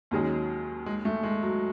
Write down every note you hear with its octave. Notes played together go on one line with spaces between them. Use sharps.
D#2 D#3 F#3 G#3 C#4 G#4
G#3
A3
G#3
F#3